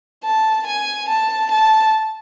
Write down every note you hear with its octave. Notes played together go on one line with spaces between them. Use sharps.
A5
G#5
A5
A5